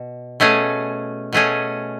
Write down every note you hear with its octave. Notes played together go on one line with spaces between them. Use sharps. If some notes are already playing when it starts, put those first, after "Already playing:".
Already playing: B2
B2 A3 C#4 G#4
B2 A3 C#4 G#4